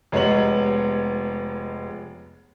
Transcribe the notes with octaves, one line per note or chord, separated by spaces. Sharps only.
F1 G#3 B3 C#5 F#7